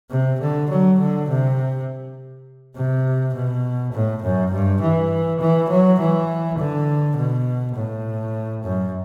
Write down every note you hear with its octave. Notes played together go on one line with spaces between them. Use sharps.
C3
D3
F#3
D3
C3
C3
B2
A2
F#2
G2
E3
E3
F#3
E3
D3
B2
A2
F#2